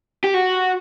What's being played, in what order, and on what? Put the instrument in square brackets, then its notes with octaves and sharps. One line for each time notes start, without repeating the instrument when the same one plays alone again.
[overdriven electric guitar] G4
F#4